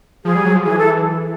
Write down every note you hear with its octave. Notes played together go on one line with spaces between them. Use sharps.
F3 G#4
G3
F#3
F3
E3 G#4
A4